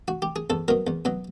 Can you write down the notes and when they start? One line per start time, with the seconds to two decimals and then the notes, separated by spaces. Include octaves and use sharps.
0.08 F#4
0.22 G4
0.36 G#4
0.50 E2 A4
0.68 B2 F#3 A#4
0.87 E2
1.05 B2 F#3